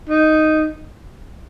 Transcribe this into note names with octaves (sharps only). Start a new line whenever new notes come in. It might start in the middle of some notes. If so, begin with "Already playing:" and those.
D#4